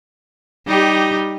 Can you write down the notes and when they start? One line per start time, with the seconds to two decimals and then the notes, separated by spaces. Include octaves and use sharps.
0.67 G3 D#4 G4